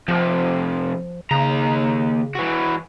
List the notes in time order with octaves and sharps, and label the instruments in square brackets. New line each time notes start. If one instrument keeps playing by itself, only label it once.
[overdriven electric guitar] F2 C3 [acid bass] F3
[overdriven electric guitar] D#2 A#5 [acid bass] C#3
[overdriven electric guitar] E3 F#4